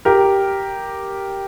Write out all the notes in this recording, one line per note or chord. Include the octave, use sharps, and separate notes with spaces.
G4 A#4